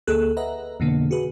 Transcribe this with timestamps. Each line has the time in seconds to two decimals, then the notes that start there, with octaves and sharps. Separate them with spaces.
0.07 D2 A#3 G#4 A4 F#6
0.37 B4 D#5 E5 F#5 A#5
0.80 F2 B2 D3 A#3
1.11 F#4 G#4 B4